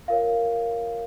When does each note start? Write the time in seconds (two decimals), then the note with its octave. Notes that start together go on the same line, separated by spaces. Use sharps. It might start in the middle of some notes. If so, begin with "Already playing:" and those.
0.08 F4 A#4 C#5 F5